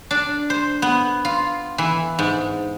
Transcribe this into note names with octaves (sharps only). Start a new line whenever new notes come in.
D4
C5
B3
F4
E3
G#2